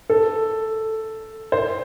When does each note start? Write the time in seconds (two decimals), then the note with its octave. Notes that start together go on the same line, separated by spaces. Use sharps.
0.10 A4
1.52 C5